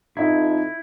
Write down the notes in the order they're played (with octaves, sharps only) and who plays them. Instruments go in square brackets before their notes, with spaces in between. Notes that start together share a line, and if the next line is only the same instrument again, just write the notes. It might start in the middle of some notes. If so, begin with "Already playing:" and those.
[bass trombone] F2 [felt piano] D#4 D#5 E5 [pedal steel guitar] E4